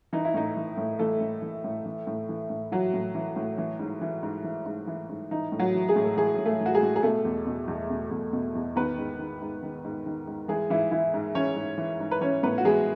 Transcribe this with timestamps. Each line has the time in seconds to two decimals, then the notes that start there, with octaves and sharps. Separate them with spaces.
0.13 E3 D#4
0.25 E4
0.34 A2 D#4
0.57 E3
0.77 A2
0.99 E3 A3 A4
1.21 A2
1.42 E3
1.64 A2
1.86 E3
2.07 A2
2.29 E3
2.50 A2
2.71 E3 F#3 F#4
2.94 A2
3.15 E3
3.36 A2
3.58 E3
3.79 G#2
4.01 E3
4.23 G#2
4.44 E3
4.66 G#2
4.88 E3
5.09 G#2
5.31 E3 D#4
5.52 A2
5.59 F#3 F#4
5.74 E3
5.88 G#3 G#4
5.96 A2
6.05 A4
6.17 E3 G#3 G#4
6.38 A2
6.46 A3 A4
6.60 E3
6.66 F#4
6.74 G#3 G#4
6.83 A2
6.96 G#4
7.03 B2 A3 A4
7.25 E2
7.47 B2
7.68 E2
7.90 B2
8.11 E2
8.33 B2
8.55 E2
8.76 D#3 B3 B4
8.98 G#2
9.19 D#3
9.41 G#2
9.63 D#3
9.84 G#2
10.06 D#3
10.27 G#2
10.48 E3 G#3 G#4
10.70 G#2 E3 E4
10.91 E3 E4
11.14 G#2
11.35 E3 C#4 C#5
11.56 G#2
11.78 E3
12.00 G#2
12.11 B4
12.21 E3 C#4 C#5
12.43 A2 B3 B4
12.58 F#4
12.64 E3 G#3 G#4